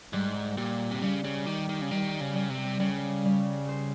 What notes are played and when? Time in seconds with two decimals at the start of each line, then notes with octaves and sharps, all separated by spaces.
0.13 G#2 G3
0.57 A#2 G4
0.91 C3
1.02 C#3 G3
1.24 C#3
1.46 D#3 G4
1.69 D#3
1.82 C#3
1.91 D#3 G3
2.21 C#3
2.35 G3
2.50 C3
2.80 C#3 G3
3.25 G3
3.69 C5